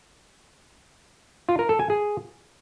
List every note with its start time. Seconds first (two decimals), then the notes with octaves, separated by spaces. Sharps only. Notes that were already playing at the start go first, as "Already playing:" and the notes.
1.49 F4
1.59 A#4
1.69 A4
1.79 G#5
1.90 G#4